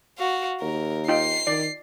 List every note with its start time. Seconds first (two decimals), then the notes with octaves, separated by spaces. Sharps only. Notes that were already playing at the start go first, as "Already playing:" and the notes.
0.18 F#4 F5
0.61 D#2 A#4
1.08 D#4 F4 G5 C7
1.47 D#3 D5